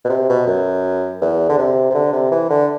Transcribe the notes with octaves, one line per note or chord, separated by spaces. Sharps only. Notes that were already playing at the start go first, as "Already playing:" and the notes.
B2
C3
B2
F#2
E2
D3
C3
C3
D3
C3
E3
D3